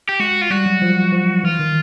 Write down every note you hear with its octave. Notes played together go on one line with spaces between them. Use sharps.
G4
G#3 F#4
F4
G3 F#4
F#3
F3
F3
E3 F4
D#3